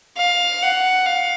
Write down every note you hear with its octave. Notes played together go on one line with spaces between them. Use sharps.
F5
F#5
F5